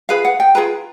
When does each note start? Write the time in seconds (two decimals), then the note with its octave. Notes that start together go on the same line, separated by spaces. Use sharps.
0.09 F4 G#4 B4 F5
0.25 F#5
0.40 G5
0.55 F4 G#4 B4 A#5